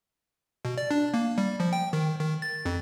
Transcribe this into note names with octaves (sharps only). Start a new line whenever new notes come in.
B2
D5
D4
A#3
G3
F3
G5
D#3
D#3
A6
F2